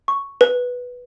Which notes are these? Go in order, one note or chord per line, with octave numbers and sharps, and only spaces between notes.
C#6
B4